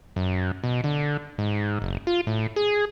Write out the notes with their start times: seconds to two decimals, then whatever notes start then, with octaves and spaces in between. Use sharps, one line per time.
0.16 F#2
0.64 B2
0.84 D3
1.38 G#2
1.82 F#1
2.07 F4
2.27 A2
2.56 G#4